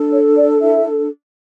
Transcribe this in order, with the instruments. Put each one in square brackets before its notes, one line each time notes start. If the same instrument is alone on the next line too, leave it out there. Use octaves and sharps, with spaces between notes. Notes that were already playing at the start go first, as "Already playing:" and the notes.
Already playing: [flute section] D4 A4
C#5
D5
E4 E5